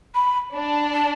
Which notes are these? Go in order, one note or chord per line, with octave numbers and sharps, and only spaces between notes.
B5
D4
A5